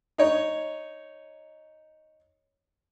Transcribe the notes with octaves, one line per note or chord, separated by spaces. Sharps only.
D#4 C#5